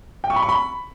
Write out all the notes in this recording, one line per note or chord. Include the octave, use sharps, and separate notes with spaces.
G5
C#6
B5
C#6
B5